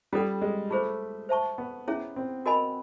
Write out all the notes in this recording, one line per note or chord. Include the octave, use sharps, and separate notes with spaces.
G3 C#4 F4 A4 D5 F#5
G#3
A3 F4 G#4 C5
C5 E5 A5 C#6
B3
C#4 E4 G#4 C#5 E5
C4
F#4 A#4 D#5 G#5 B5